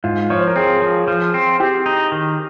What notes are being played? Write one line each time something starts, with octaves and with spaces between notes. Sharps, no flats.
G#2 F4
F3 C#5
C5
A#4
C4 G#4
F3
F3
C4
C4 G4
D#4
D#3